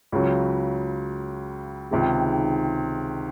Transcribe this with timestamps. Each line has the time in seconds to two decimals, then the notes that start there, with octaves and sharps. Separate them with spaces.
0.12 C#2 C#3 F#3
1.91 C#2 C3 D#3 G#3